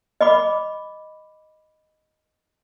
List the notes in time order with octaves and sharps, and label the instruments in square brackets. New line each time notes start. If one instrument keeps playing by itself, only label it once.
[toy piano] D#5 B5 D6